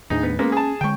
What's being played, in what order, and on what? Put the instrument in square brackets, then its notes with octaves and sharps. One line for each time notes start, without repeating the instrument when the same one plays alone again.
[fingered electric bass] D#2 A2 D4 [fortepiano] D#4 G#4
[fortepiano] B3
[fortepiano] G#3 A#3 B3 [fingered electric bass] C#4
[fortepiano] G#4 A5
[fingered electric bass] D3 G#3 [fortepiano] G5 C#6